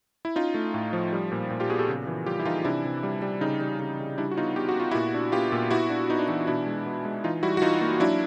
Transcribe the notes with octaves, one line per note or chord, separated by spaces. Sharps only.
E4
C#4 D#4 F4
A3
A2
F3
G3
A#2
A#2
F4 G4
B3 F#4 G#4
G4 A4
C#3
E3
G3 F4 G4
E4
E3 D#4 F4
C3 D4 E4
C3
G3
G3
C#3 D#4
G3
C#3
C#3
G3 D4 E4
F#4
B3 D#4 F4
B3 G4
F#4
B3 F4
A#2 E4 F#4
D4
B3 F4 G4
A#2
B3 E4 F#4
D4
B3 D#4
D4
E3 D#4
B2 D4 E4
G#3
B3
G#3
E3 D#4 F4
G3 E4 F#4
F#4
E3 D#4 F4
A#3
F#3 D4 E4